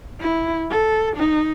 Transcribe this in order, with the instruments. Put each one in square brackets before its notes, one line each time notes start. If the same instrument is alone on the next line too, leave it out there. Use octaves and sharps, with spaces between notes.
[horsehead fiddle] E4
A4
D#4